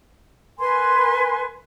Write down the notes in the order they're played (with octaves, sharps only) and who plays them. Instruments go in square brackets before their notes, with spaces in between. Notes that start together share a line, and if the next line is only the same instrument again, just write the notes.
[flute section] A#4 B4 G#5 C6